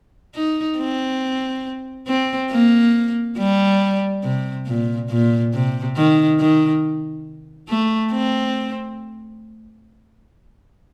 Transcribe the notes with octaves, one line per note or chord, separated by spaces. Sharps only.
D#4
C4
C4
A#3
G3
C3
A#2
A#2
C3
D#3
D#3
A3
C4